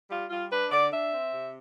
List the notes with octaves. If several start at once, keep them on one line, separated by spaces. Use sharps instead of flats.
G3 F4
G3 F4
D4 B4
D3 D5
D4 E5
C4
C3